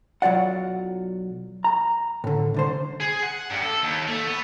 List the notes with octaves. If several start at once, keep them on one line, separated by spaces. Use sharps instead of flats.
B1 F#3 F4 D5 F#5
A#5
A2 D3
C2 D3 C5
G#4
F#5
G2
A4
D#2
A3
B3